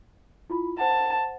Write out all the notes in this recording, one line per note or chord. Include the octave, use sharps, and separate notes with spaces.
E4 F4 B5
C5 F#5 A5